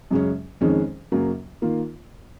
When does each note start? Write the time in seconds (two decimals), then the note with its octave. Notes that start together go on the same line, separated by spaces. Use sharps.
0.11 F#2 C#3 G#3 C#4
0.61 F2 D#3 G#3 C#4
1.12 F#2 C#3 F#3 A#3
1.62 D#3 A#3 F4